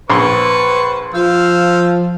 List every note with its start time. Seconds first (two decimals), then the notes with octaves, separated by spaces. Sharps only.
0.10 A#1 B4 C5 C6 C#6
1.14 F3 C5 F5 E6